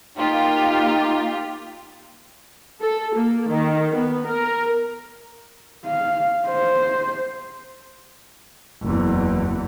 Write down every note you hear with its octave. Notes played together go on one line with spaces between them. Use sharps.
A#3 D#4 F4 G4
A4
A#3
D#3
B3
A#4
F5
C5
F#1 E2